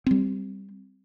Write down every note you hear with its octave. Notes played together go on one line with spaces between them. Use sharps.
G3 C4